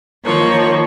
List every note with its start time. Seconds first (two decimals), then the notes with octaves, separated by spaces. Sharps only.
0.25 D#3 F3 A#3 C#5